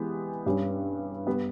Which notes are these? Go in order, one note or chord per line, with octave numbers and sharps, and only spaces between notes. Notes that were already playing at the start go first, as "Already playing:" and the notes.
Already playing: E3 G#3 B3 G4
G2 G3 C#4
G3 B3